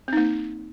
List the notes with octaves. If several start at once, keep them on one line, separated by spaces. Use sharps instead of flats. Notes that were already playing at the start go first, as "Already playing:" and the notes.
A#3 C4 D#4